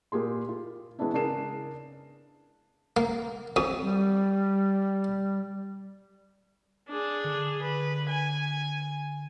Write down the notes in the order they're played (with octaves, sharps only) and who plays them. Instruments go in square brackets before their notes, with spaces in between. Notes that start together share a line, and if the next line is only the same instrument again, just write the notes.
[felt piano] A#2 G4 G#4 C6
F4
E3 G#3 B3 C#4 D4 E4
C#3 D4 G#4 A#4 C7 E7
[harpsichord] A#3
F2 D#6
[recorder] G3
[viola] D4 G#4
[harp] D3
[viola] B4
G#5